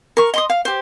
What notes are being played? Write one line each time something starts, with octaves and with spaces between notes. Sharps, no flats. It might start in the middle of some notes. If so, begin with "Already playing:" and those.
A#4 C#6
D#5 C6 D#6
F5
G4 C5